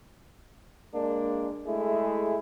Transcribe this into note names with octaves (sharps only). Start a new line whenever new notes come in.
G#3 A#3 D4
G#3 A3 E4 G#4